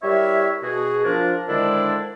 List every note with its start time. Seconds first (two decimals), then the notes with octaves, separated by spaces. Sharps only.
0.02 G3 E4 A#4 C#5 E5
0.63 B2 F#4 G#4
1.04 F3 D4 A#4
1.49 D3 D#3 G#3 D4 E4 C5